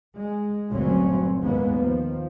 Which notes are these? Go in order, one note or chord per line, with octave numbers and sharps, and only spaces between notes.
G#3
G1 D2 A#2 F#3 C4 C#4
D#2 G#2 G#3 A#3 B3
D#3 F3